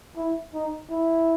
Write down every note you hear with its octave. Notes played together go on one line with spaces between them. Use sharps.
E4
D#4
E4